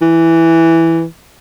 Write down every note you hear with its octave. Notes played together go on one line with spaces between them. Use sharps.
E3